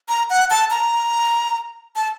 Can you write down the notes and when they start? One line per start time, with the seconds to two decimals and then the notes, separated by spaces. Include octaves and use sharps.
0.08 A#5
0.30 F#5
0.50 A5
0.70 A#5
1.96 A5